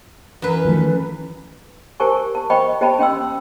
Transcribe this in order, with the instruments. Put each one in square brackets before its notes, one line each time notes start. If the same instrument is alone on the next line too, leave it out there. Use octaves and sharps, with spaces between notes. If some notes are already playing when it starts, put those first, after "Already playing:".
[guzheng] F#2 B4 [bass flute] E3
[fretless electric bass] D#3 F3 A3
[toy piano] G4 A#4 C5 G#5 A5 C#6
A5
C5 D#5 G5 B5 C#6
G4 C5 D#5 G5 A5 B5
C#4 G5 C6 E6